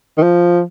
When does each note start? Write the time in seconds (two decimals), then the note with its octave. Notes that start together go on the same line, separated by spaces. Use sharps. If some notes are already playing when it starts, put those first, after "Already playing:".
0.17 D#3
0.23 F3